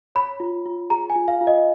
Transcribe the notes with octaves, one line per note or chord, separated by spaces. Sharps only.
C#5 B5
F4
F4
G#4 A#5
G#5
F4
F5
F4
D#5